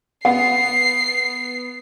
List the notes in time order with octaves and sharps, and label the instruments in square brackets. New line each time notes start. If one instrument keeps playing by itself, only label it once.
[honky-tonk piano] B3 [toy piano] F#5 [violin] C7